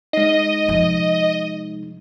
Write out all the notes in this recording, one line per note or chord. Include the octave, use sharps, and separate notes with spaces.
G#3 D#4 D#5
C3 F3